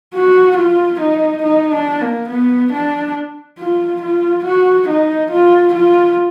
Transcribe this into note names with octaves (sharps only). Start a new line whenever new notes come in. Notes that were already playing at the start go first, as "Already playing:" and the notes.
F#4
F4
D#4
D#4
D4
A#3
B3
D4
F4
F4
F#4
D#4
F4
F4